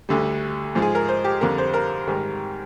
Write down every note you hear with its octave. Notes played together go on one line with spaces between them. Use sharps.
D2 D3 G3
G#2 F3 G#3
G#4
A#4
C5
G4
F2 D3 G3 A#4
C5
A#4
G#2 D#3 G3